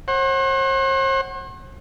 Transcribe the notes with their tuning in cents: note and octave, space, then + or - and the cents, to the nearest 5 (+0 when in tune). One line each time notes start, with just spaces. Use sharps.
C5 +45 F#5 +15